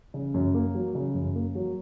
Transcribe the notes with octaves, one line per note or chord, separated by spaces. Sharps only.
C#3
F#2
A#3
F#3
C#3
F#2
A#3
F#3